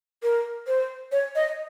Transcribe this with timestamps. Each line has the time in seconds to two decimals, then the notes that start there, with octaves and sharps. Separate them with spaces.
0.23 A#4
0.67 C5
1.12 C#5
1.35 D#5